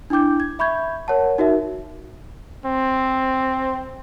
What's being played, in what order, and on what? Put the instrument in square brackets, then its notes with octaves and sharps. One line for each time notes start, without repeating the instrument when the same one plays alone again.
[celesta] D4 E4 G5 D6 G6
G#6
E5 B5 C#6 G6 G#6
A#4 C#5 F#5 A5
D#4 F#4 A#4 E5
[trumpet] C4